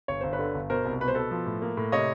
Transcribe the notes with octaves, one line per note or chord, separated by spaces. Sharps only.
G1 C#5
G1 C5
B4 C#5
D3
G1
B2 A#4 C5
C2
B2 B4
C5
B2 A4 B4
F3
A2
A#3
A2
C3 C#5 D#5